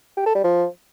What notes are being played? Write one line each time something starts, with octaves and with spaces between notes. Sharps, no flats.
G4
A4
G3
F3